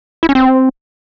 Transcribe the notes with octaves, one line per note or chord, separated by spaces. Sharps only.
E4
C#4
C4